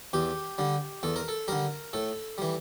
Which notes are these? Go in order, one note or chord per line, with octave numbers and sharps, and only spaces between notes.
E2 G4
D3 G3
E2 A4
A#4
A4
D3 G3 A#4
A2 A4
E3 G3